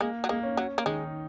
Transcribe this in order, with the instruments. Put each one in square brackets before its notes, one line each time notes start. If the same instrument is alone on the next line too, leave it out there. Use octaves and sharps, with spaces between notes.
[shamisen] G#3 [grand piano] A#3
[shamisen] F#3
[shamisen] G#3 [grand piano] A#3
[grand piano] C#4
[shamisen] F#3
A#3
[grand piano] D#3 D#4 [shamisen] G#3